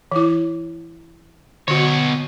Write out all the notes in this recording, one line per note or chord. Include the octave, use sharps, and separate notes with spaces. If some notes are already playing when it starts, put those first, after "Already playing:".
E3 E4
B2 D3 F#4 C#5